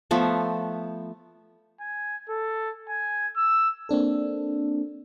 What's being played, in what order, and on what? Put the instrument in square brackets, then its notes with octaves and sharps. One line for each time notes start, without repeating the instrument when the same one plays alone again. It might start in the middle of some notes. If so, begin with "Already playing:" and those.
[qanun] F3 A3 B3
[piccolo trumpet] G#5
A4
G#5
E6
[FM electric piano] A#3 C4 D4 A4